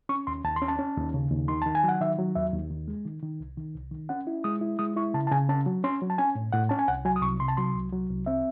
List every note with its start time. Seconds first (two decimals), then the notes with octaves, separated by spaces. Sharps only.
0.09 C#4 C#6
0.27 D#2 C6
0.44 D#2 A5
0.56 C6
0.62 C#4
0.68 A5
0.79 C#4
0.97 D#2
1.14 C#3
1.31 D#2
1.48 D#3 C6
1.62 D#3 A5
1.75 G#5
1.84 F#3 F#5
2.00 D#3 E5
2.18 F#3
2.35 D#2 E5
2.53 D#2
2.71 D#3
2.88 G#3
3.05 D#3
3.23 D#3
3.40 C2
3.57 D#3
3.75 C2
3.92 D#3
4.09 C#4 F#5
4.27 E4
4.44 G#3 D#6
4.61 E4
4.79 G#3 D#6
4.96 E4 C#6
5.14 C#3 A5
5.27 A5
5.32 C#3 G#5
5.49 C#4 A5
5.66 F#3
5.84 C#4 C6
6.01 F#3
6.10 A5
6.18 C#4 G#5
6.35 A2
6.52 A2 F#5
6.69 C#4 A5
6.79 G#5
6.88 C2 F#5
7.05 F#3 G#5
7.16 D#6
7.22 C2 C#6
7.40 C3 C6
7.48 A5
7.57 F#3 C6
7.75 C2
7.92 F#3
8.10 C2
8.26 C4 E5